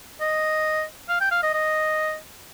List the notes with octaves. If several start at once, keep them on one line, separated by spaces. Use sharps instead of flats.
D#5
F5
G5
F5
D#5
D#5